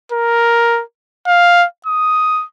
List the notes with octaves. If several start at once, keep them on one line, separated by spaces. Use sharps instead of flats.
A#4
F5
D#6